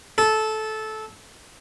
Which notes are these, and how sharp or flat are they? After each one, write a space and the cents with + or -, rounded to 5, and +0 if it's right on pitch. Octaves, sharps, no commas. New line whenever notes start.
A4 -15